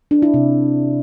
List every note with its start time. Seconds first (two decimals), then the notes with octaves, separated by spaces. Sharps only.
0.11 D4
0.22 E4
0.34 C3